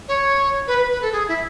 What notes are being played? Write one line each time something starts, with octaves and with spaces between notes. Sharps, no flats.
C#5
B4
B4
B4
A4
G#4
E4